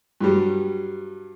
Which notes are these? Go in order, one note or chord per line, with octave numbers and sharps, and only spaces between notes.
G2 F#3 G3